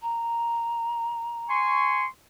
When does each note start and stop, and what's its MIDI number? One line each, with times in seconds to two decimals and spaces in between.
0.01 1.49 82
1.49 2.04 80
1.49 2.04 84
1.49 2.04 85